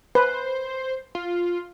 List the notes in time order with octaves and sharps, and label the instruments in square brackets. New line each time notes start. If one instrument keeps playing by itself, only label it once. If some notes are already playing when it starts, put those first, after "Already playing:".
[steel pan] B4 [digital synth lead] C5
[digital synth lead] F4